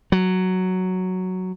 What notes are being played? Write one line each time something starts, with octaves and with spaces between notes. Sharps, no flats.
F#3